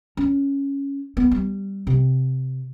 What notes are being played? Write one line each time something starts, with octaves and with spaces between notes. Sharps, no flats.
C#4
B3
G3
C3